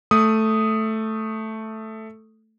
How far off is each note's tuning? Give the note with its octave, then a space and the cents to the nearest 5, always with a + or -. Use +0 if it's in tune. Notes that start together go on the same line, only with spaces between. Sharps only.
A3 +0 D#6 +0